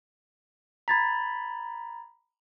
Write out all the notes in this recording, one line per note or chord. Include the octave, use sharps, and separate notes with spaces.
A#5 B5 G#6 A6 B6